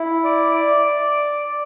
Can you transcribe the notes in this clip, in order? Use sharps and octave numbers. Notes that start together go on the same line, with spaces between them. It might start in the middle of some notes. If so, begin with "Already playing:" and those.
Already playing: E4
D5
D5
D5